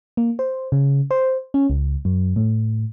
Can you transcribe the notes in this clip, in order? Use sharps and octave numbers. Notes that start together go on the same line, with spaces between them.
A#3
C5
C#3
C5
C#4
C#2
F#2
A2